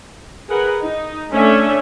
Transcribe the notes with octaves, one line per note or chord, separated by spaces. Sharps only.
G#4 A#4 B4 F#5
D#4
A3 C#4 D4 A4 E5